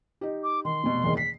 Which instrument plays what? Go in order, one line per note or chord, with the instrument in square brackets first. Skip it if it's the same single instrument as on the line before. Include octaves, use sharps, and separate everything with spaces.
[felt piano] D#4 G4
[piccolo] D6
[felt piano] D#3 [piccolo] C6
[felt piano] F1 B2
F#1 E2 D#3
[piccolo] B6 [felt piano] C7